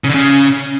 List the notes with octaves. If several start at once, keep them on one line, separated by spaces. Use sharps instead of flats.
C#3
D3
C#3